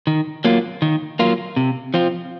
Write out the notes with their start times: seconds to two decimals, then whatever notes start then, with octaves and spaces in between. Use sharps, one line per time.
0.07 D#3
0.45 F#3 A#3 F4
0.82 D#3
1.19 F#3 A#3 F4
1.56 C3
1.94 F3 C4 F4